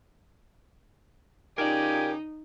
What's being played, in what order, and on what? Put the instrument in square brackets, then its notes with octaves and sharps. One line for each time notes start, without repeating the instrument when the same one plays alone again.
[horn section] C#3 F4 G4 [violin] D#4 [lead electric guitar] A#4 D5 [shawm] G#5